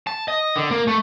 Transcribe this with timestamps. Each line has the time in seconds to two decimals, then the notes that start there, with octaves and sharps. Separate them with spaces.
0.07 A5
0.28 D#5
0.56 D3
0.71 A#3
0.87 A3